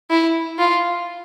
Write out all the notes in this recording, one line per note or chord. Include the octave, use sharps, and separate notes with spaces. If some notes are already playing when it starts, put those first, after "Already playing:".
E4
F4